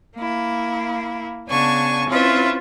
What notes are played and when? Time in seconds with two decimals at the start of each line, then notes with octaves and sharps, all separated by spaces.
0.17 A#3 E4
1.49 C#3 B3 D4 G#5 A5 C#6
2.08 C4 C#4 E4 F4 B4 E5